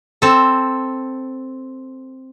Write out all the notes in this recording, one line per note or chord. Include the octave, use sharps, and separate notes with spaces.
C4 A4